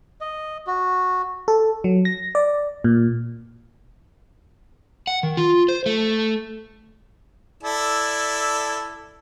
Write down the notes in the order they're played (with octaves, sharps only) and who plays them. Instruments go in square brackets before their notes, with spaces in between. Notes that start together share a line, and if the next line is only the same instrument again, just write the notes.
[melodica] D#5
F#4
[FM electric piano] A4
F#3
A#6
D5
A#2
[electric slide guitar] F#5
D#3
F4
C5
A3
[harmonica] E4 A4 D5